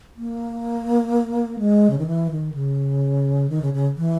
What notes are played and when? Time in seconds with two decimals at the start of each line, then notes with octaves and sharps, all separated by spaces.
0.17 A#3
1.59 G#3
1.90 C#3
1.99 D#3
2.07 E3
2.31 D#3
2.54 C#3
3.50 D#3
3.62 C#3
3.74 C#3
3.97 E3